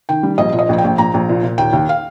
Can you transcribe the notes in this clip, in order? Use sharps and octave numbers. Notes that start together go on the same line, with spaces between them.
D#3 G5
G3
A#1 D#5
A#2
D#5
A#1
G5
A#1
A#1 A#5
A#1
A#2
A#2
D#2 G5
D#2
F5